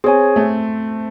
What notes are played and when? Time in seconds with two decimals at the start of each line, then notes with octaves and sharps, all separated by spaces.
0.04 C4 G#4 C#5 G#5
0.36 A3